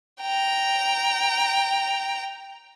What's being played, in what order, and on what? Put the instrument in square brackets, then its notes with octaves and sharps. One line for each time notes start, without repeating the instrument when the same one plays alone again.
[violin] G5 A#5